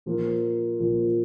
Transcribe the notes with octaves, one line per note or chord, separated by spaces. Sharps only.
A#2 F3 A#3 F4
A#2 F3 A#3 F4